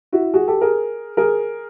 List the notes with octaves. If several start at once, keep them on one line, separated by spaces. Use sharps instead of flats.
E4 F#4
F#4 G#4
G4 A4
G#4 A#4
G#4 A#4